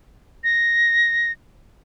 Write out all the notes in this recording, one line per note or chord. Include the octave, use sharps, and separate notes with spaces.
A#6